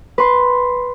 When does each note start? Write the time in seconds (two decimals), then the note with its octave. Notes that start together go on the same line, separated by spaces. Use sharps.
0.18 B4 C6